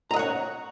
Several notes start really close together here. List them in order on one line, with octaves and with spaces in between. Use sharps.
A#5 D#5 F#5 C#5